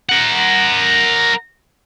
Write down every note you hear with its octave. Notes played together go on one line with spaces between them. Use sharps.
A#4 F#5